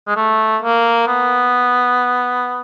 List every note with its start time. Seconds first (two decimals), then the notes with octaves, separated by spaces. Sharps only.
0.07 G#3
0.16 A3
0.62 A#3
1.07 B3